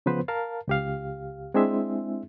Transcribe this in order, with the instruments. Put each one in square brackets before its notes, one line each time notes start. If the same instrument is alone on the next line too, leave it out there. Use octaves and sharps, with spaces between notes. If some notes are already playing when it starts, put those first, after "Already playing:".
[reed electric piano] C#3 F3 B3 B4 C5
A#4 F5 A5
C#2 G4 F5
G#3 C4 D4 E4 G#4 E5